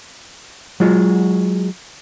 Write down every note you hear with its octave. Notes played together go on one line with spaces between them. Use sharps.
F#3 G#3 F4 F#4